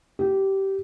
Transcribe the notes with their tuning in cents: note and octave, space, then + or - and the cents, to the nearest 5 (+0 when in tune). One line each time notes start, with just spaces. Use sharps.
G4 -15